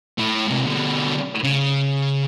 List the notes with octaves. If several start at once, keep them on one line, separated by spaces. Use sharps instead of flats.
A3 E4
C3 G#3
B2 D3
C#3